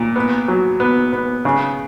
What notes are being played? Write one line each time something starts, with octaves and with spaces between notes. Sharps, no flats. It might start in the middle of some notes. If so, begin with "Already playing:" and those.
Already playing: A#2
B3
F#3
B3
B3
C#3